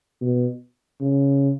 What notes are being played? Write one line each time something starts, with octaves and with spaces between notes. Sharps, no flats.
B2
C#3